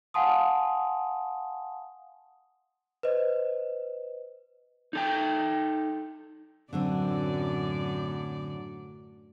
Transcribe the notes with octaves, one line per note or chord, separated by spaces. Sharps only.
F5 F#5 G#5 A5 C6 D#6
B4 C5 D#5
D#4 A4 G5
F#2 A2 D3 F#3 C4 D5